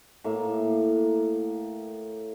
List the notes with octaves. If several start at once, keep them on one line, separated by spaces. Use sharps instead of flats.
A2 A#3 E5 F5